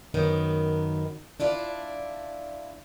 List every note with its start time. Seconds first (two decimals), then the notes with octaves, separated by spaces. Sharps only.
0.14 F#2 D#3 B3
1.40 D4 E4 F4 D5